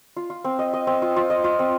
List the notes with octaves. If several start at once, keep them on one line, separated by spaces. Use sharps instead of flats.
F4
F4
C4
D#5
D#5
C4
F4
F4
D#5
F4
C4